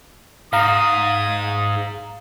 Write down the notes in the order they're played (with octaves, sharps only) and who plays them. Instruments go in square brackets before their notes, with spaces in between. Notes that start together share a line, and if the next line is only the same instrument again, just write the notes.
[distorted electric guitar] G#2 [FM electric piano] F5 A#5 [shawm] D#6